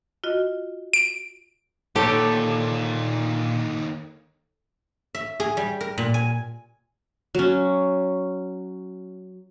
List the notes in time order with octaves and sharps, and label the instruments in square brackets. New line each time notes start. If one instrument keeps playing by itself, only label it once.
[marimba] F4 F#4 D#5
[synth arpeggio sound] D7
[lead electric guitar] D#2 D3 [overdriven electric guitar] A#2 [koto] G4 [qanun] A4 C#5
[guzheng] E5
G#4
G3
A#4
A#2
G#5
[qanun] F#3 C#4